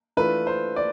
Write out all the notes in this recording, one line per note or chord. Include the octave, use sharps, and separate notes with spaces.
E3 A3 D4 F4 B4
C5
D5